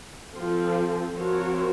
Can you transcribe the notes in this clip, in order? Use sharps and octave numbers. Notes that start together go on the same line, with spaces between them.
F3 C4 F4 A4
F3 C4 F#4 A#4 C#5